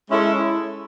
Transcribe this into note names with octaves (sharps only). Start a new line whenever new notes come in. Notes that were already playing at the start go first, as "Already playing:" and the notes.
G#3 C#4 E4 A4